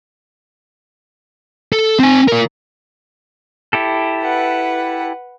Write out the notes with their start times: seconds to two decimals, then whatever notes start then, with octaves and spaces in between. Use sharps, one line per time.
1.73 A4
1.99 C4 G#5
2.28 F4 A#4
3.73 E4 G4 A4
4.22 B4 F#5